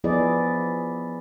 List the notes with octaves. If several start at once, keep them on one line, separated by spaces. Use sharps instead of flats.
F3 B3 E4 G#4 D5 D#5